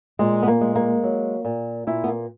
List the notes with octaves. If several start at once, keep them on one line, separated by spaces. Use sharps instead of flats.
A#2 G#3
B3
A#3
G#3
A#3
F#3
A#2
A#2 E4
B3
A#3